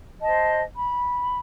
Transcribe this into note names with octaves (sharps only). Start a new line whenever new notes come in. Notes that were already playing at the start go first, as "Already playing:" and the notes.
C5 D#5 A5
B5